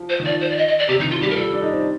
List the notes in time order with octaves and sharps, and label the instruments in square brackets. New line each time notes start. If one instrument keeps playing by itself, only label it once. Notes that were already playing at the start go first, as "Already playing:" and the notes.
Already playing: [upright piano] F3
[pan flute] C5
[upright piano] D#3
[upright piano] F3 [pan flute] D5
[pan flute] C5
D5
D#5
D#5
D5
[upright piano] C3 [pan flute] G4
[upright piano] D#3 [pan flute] D#4
[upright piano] F3 [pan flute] F4
[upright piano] G3 [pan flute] G4
[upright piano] F3 [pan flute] A#4
[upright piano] G3 [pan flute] A4
[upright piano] D4
D#4
C4